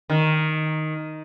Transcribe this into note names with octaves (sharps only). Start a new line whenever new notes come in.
D#3